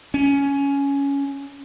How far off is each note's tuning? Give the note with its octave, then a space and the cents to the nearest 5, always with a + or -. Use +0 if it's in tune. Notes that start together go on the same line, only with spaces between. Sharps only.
C#4 +10